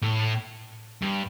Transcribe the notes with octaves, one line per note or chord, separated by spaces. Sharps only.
A2
G2